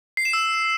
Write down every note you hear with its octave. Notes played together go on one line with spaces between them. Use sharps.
C7
E7
E6